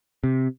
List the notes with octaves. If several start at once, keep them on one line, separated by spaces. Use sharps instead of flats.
C3